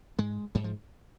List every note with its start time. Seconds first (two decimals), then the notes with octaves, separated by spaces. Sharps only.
0.18 G#2 G#3
0.55 G#2 G3
0.64 F3